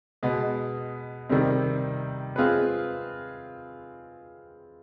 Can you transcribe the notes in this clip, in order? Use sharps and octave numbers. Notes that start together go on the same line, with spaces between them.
B2 G#3 B3
C3 D#3 G3 C4
G#3 C4 F4 G#4 B4